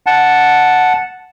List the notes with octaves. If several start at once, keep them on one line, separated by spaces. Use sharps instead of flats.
F#5 A5